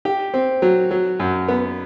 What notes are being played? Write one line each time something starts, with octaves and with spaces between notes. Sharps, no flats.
G4
C4
F#3
F#3
F#2
B3